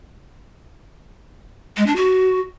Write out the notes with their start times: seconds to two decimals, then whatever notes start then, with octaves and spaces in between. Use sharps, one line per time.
1.77 G#3
1.86 D4
1.96 F#4